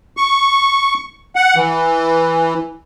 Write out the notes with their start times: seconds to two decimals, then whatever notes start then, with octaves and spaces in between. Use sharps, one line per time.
0.17 C#6
1.36 F#5
1.56 E3